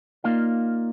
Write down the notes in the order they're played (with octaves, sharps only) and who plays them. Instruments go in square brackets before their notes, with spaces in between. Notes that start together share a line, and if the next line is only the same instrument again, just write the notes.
[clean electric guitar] A#3 D#4 F4 D5 F5